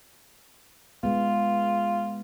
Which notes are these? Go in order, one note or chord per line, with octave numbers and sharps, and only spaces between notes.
G#3 B3 F4